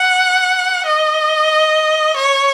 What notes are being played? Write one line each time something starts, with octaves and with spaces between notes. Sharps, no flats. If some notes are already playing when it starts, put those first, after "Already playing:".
Already playing: F#5
D#5
C#5